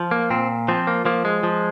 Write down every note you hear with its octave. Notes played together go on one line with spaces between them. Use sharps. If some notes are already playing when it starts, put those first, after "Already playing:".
Already playing: F3
A#3
A#2 C4
F3 C4
A#3
F3 A#3
G#3
F3